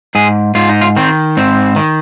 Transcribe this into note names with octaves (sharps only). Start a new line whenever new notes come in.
G#2 G#4
G#2 F4
D#4
F4
D#3 C4
G#2 C4
D#3